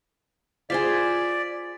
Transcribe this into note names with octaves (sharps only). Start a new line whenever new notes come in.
F4 G#4 C5 D5 F5 B6